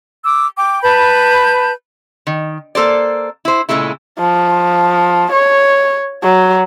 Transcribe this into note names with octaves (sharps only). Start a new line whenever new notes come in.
D6 E6
G5 D6
B4 A5 B5 G6
D#3
A#3 A4 C5 D5
E4 C5
A#2 C#3 G#3 A3 E4
F3
C#5
F#3